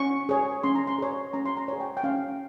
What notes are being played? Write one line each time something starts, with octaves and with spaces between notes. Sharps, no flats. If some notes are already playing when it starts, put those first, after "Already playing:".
Already playing: C#4 C#6
G#4 C#5
C#4 C6
A#5
C6
G#4 C#5
C#4 A#5
C6
A#5
G#4 C#5
G5
G5
C#4 F5